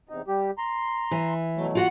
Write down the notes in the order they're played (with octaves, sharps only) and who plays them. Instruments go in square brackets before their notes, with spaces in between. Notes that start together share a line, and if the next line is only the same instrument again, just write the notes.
[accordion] E2 C3 D#4
G3 G4
A#5 C6
[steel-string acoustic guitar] E3
[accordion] B2 F#3 A3
[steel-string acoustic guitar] F4 F#4 F#5